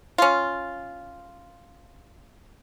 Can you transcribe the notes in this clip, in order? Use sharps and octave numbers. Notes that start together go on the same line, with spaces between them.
C#4 F4